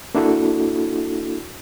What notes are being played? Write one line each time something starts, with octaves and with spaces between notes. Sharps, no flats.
A#3 D4 E4 F#4 A4